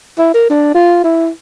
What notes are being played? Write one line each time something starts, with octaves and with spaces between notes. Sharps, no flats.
E4
A#4
D4
F4
E4